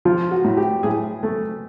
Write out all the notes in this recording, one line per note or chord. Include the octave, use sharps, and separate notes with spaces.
F3 F4
F#4
A2
G4
A2 G#4
A3